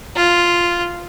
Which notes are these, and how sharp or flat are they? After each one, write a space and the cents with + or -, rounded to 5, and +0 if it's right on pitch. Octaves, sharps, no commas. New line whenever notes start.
F4 -5